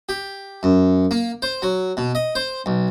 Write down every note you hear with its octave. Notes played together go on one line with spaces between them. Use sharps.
G4
F#2
A#3
C5
F#3
B2
D#5
C5
B1